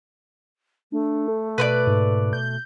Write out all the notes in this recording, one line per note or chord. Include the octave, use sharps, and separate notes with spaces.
A3 D4
A4
B2 B4 C5 D5
G#2
G6